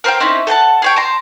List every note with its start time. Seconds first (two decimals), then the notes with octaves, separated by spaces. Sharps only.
0.04 A#4 C5 F5 G5
0.20 C4 C#4 D#4 E4
0.47 A4 F#5 G5 A5
0.82 G#4 C#5 G5
0.96 A5 A#5 C6